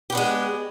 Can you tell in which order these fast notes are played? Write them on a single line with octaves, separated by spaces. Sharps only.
G4 B3 D4 G#3